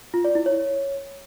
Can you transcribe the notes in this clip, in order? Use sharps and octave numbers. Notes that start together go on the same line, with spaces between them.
F4
D5
E4
C#5